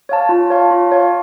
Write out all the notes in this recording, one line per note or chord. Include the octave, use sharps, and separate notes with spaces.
C#5 F5 A5
F4
C#5 F5 A5
F4
C#5 F5 A5